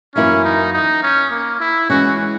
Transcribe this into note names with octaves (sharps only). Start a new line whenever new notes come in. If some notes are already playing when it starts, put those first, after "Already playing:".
F#2 E3 A#3 C#4 E4
D#4
D#4
C#4
A#3
E4
E3 G#3 C#4 F#4